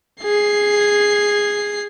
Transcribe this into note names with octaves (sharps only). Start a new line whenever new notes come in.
G#4 C7